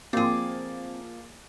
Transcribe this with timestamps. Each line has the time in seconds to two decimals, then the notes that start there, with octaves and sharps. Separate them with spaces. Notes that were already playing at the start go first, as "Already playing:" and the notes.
0.13 F3 A#3 C4 G#4 D5